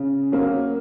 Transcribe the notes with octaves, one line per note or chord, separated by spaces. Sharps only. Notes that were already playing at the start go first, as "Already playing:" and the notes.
Already playing: C#3
F#3 A#3 C#4